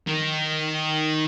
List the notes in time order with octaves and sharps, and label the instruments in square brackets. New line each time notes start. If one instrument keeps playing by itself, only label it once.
[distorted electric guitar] D#3